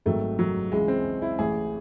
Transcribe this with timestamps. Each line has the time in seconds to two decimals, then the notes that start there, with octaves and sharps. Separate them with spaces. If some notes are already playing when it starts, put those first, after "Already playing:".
0.06 G#1 G#2 D#3 F#3 A3
0.39 F#3
0.72 C#2 C#3 E3 G#3
0.88 C4
1.22 E4
1.39 A1 A2 E3 G#4